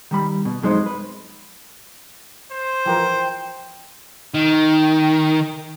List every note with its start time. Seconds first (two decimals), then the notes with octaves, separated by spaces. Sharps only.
0.11 D#3 G3 B5
0.45 B2
0.63 F2 F#3 G#3 D#4 C5
0.86 B4
2.51 C5
2.86 E3 F3 A#4 G5
4.34 D#3